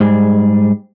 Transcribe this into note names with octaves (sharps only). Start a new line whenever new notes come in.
G#2 G3 G#4